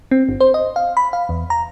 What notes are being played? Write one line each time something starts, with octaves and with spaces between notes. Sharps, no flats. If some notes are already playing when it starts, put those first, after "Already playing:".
C4
G1
C5
D#5
F5
B5
F5
E2
A#5